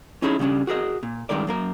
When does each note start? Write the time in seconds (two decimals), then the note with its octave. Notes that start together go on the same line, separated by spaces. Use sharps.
0.22 C#4 D#4 E4 G#4 C#5
0.39 C#3 G3 G#3 C#4 D4
0.67 F#4 G#4 A#4 D#5
1.03 A#2
1.29 G2 C3 D#3 G#3 A#4 D5
1.47 F#2 A#3 A#4